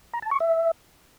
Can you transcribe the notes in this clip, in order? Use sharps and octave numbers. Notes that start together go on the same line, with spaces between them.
A#5
A5
C#6
E5